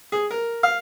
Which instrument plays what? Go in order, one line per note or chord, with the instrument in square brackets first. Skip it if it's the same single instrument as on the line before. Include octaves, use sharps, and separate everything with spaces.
[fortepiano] G#4
A#4
F5